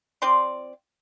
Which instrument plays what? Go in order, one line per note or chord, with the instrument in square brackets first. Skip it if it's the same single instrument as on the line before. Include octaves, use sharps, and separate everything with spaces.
[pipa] F3 C4 D5 C6